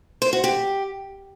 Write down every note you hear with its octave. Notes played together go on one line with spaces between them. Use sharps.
C5
F#4
G4